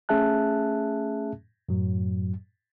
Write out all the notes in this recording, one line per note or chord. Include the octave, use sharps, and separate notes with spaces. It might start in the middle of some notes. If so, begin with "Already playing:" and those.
A3 C#4 G#4 E5 A5 F#6
F#2 A2 F#3